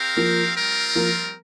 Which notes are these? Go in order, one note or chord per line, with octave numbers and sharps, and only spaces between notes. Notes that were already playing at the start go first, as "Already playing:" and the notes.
Already playing: C4 G4 A#4 F5
F3 A#3
G3 C4 F4 A#4
F3 A#3